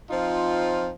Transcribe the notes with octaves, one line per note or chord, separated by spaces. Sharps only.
F3 C4 D#4 F4